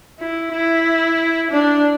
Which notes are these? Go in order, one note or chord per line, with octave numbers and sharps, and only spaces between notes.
E4
E4
D4